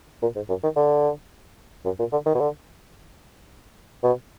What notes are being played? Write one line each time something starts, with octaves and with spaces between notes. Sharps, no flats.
A#2
G#2
F#2
D#3
D3
F#2
A#2
D3
D#3
B2
D3
B2